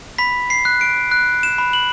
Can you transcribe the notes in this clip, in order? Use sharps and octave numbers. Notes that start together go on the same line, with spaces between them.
B5 B6
C7
F#6
D7
F#6
E7
B5
F#7